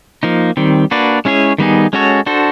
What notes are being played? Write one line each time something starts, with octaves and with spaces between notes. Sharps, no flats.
F3 A#3 D#4
D#3 G3 C4
A#3 D4 F#4 B4 D5
G#3 C#4 E4 G#4 C#5
D#3 G3 B3 D#4 G#4
G#3 C#4 F#4 A4 C#5
D4 F#4 A4 C5